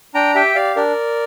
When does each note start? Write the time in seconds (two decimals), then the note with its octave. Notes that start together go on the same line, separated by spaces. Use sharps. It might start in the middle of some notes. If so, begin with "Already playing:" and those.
0.15 D4 G5 A#5
0.35 G4 E5 G5
0.55 G4 D5 F5
0.76 D4 A#4 D5